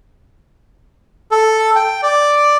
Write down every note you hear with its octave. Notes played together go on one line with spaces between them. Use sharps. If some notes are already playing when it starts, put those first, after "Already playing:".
A4
G5
D5